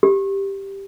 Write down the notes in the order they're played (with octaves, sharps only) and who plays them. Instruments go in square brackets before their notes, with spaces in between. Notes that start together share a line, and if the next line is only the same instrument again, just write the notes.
[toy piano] G4